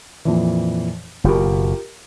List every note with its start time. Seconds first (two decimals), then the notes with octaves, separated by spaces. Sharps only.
0.25 F2 A#2 E3
1.24 F#1 B2 F4 G4 A#4